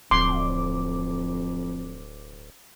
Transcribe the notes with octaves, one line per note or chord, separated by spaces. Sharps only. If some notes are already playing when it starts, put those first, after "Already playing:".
D1 F2 C6 D6